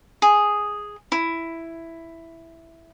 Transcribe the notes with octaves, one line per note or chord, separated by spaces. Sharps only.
G#4
E4